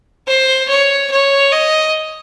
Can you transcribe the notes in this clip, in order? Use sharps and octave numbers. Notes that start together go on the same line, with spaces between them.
C5
C#5
C#5
D#5